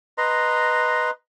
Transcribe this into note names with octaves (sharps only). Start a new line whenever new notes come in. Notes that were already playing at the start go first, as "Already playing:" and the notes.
B4 D#5 A#5 C6